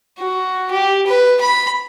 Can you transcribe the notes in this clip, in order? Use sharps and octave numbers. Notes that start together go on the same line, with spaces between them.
F#4
G4
B4
B5